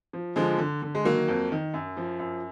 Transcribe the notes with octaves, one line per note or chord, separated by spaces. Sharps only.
F3
D3 F3 G#3
D3
D3
G#3
D#3 F#3 A#3
F2
D#3
F#2
F3
F#2